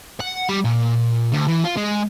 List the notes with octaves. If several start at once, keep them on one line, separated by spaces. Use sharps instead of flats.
F#5
G3
A#2
D2
E3
F4
G#3